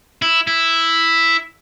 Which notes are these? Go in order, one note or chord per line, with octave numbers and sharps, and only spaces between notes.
E4
E4